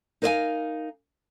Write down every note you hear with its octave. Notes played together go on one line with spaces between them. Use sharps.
D#4 A#4 C5 D#5 F5 G#5